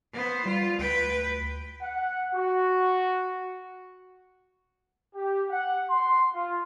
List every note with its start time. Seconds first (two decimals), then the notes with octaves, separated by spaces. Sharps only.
0.13 B3 C5
0.46 G3 F4
0.79 D2 B4 G5
1.82 F#5
2.35 F#4
5.14 G4
5.50 F#5
5.90 C6
6.33 F4